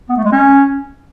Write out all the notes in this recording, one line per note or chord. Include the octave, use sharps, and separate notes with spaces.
B3
A3
G#3
C#4